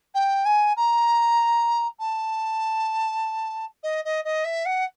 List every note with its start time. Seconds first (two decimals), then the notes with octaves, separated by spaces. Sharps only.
0.14 G5
0.45 G#5
0.76 A#5
1.99 A5
3.83 D#5
4.04 D#5
4.24 D#5
4.44 E5
4.65 F#5